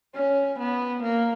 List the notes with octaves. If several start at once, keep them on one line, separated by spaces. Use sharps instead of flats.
C#4
B3
A#3